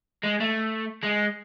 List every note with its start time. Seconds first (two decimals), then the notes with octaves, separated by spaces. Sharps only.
0.24 G#3
0.40 A3
1.03 G#3